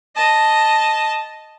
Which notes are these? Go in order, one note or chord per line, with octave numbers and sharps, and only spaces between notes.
D#5 A5